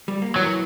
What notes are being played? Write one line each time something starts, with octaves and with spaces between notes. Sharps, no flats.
G3
A#3
E3 F#3